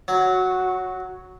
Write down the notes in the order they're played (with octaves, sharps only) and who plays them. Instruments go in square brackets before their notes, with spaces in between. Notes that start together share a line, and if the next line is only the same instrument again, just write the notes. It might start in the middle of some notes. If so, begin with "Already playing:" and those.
[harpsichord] F#3 [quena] F#4